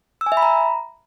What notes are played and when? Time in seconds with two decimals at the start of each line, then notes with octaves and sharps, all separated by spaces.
0.21 E6
0.26 G#5
0.32 E5
0.37 B5
0.42 A#5